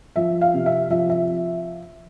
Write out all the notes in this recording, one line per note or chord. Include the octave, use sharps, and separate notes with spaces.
F3 E5
F5
C3
E5
F3 E5
E5